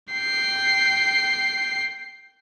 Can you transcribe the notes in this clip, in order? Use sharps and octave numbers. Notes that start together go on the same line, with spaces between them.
G5 C7